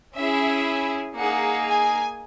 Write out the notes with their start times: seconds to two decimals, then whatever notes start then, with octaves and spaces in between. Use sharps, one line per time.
0.16 C#4 E4 G#4 E5
1.16 A#3 D#4 G#4 F#5
1.68 G#5